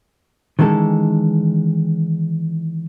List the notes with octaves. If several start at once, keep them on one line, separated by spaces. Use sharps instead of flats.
D#3 E3 G#3 C#4 A4